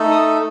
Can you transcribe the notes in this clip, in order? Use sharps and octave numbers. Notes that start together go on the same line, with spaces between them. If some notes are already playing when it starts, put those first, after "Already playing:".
Already playing: A3 D#4 A4
D#6